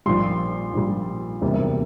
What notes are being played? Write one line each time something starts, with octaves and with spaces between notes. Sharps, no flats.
A#1 A#2 G3 C6
A#1 A#2 G3
E1 D2 C3 G3 A#3